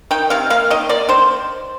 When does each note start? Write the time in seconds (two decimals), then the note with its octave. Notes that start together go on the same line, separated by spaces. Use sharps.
0.11 D#3 G5
0.30 C3 F5
0.50 A#3 F5
0.70 D#3 D#5
0.89 A#3 D5
1.09 D#3 C5